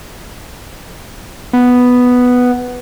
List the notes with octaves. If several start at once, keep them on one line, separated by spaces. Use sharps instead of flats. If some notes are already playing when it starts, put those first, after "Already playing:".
B3